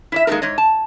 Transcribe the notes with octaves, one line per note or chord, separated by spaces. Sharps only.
E4 D5 E5
G#3 A#3 D#4 G4 A4 A#4
G#2 C#5 D#5
A5